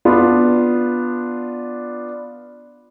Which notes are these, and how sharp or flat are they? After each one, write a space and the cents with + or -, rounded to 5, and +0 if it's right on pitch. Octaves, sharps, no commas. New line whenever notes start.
B3 -5 D4 +0 F4 +0